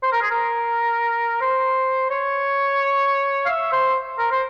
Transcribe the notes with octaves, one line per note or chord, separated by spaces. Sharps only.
C5
A#4
G#4
A#4
C5
C#5
F5
E5
C5
A#4
C5